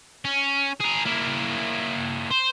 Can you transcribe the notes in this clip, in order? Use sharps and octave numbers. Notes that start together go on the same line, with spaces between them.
C#4
G#4 A#4
A#3 E4
C5